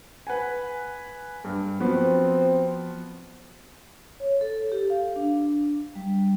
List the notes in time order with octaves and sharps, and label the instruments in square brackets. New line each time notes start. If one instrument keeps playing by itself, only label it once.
[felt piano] B4 F#5 G#5
G2
[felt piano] F3 B3 F#4 [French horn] C4
[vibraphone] C#5
A4
G4
F5
D4
G3